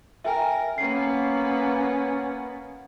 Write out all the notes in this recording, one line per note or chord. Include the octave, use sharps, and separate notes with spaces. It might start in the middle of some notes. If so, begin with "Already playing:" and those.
A#4 E5 G5 G#5
A#3 B3 C#4 C7